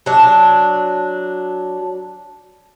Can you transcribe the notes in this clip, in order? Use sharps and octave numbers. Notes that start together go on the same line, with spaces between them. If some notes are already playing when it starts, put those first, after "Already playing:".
F#3 D4